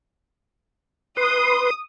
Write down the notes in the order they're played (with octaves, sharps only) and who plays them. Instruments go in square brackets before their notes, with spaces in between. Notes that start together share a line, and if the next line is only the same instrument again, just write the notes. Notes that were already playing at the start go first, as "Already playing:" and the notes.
[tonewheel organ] B4 C6 [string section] D#6